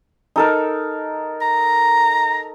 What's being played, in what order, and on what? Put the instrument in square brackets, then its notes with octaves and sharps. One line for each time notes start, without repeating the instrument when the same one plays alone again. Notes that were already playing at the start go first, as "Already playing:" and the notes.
[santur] D#4 A4 A#4
[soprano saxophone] A#5